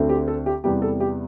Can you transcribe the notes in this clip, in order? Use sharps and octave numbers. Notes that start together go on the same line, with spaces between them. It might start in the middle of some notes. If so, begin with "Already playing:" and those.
Already playing: D2 D3 A3 C4
G4
A4
G4
E2 C3 G3 B3 G4
A4
G4